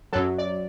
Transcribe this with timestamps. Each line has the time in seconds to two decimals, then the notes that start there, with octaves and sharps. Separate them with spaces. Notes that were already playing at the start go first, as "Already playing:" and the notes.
0.13 F#2 F#3 A4
0.38 D5